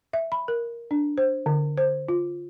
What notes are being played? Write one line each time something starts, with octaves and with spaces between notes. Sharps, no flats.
E5
B5
A#4
D4
C5
D3
C5
F4